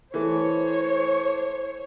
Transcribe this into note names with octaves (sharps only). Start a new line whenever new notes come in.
E3 A3 C5 C#5